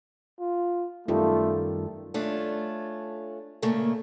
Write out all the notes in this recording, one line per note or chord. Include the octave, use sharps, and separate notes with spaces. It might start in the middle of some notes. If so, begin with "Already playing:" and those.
F4
F#2 D#3 G3 A3 F4 A4
A3 C#4 D4 F4
A#2 C#3 A3 A#3